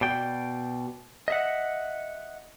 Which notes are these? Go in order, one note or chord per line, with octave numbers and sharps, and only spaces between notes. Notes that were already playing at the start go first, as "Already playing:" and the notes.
B2 D5 G5
D#5 E5 F#5